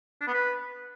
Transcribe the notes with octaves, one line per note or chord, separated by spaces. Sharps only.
D4
B3
B4